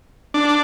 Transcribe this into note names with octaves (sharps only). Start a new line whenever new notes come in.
D4